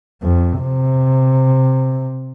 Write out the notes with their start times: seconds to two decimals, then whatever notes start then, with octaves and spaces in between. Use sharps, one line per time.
0.22 F2
0.61 C3